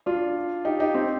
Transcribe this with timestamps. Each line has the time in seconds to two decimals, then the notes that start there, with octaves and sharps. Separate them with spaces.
0.06 D4 F4
0.65 D#4 G4
0.80 D#4 G4
0.95 C4 D#4